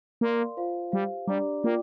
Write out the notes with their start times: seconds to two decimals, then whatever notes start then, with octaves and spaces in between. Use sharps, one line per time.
0.21 A#3 A#4 D5 F5 C6
0.57 F4 C5 F5
0.92 G3 G4 C5 F5
1.27 G3 D4 G4 D5 A#5 D6
1.63 A#3 F4 D5 G5 D6